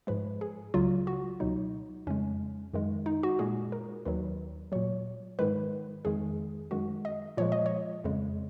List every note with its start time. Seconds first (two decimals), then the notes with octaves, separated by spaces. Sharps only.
0.07 G#2 F3 G#3 B4
0.41 G#4
0.74 C#2 C#3 F#3 F4
1.07 F#4
1.40 C#2 B2 F#3 D#4
2.07 F2 C#3 G#3 C#4
2.74 F#2 D#3 G#3
3.06 D#4
3.23 F#4
3.39 A#2 G#3 G#4
3.72 A#4
4.05 D#2 D#3 F#3 B4
4.72 A#2 F#3 C#5
5.39 G#2 D#3 G#3 B4
6.05 F2 D#3 G#3 G#4
6.71 F#2 D#3 G#3 F#4
7.05 D#5
7.37 A#2 F3 G#3 C#5
7.52 D#5
7.66 C#5
8.04 F2 C#3 G#3